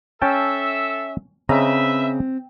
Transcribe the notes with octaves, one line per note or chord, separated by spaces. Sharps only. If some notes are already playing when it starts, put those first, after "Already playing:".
C#4 A4 E5 G5 A5
C#3 C4 B4 D#5 E5 A#5